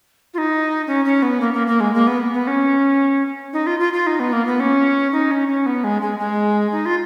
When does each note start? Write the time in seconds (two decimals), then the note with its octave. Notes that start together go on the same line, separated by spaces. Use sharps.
0.34 F4
0.38 D#4
0.87 C#4
1.05 C#4
1.22 B3
1.41 A#3
1.53 A#3
1.67 A#3
1.80 G#3
1.94 A#3
2.07 B3
2.34 B3
2.47 C#4
3.53 D#4
3.67 F4
3.80 F4
3.93 F4
4.07 D#4
4.20 B3
4.33 A#3
4.46 B3
4.60 C#4
5.12 D#4
5.31 C#4
5.48 C#4
5.66 B3
5.84 G#3
6.02 G#3
6.19 G#3
6.72 D#4
6.86 F4